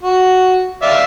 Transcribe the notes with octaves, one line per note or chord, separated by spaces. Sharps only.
F#4
D5 E5 F5